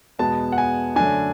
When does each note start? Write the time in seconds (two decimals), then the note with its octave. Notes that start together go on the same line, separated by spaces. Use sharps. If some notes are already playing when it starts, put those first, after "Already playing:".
0.19 E2 B2 G#3 B3 A5
0.52 F#5
0.58 G#5
0.96 F#2 D3 A3 D4 G#5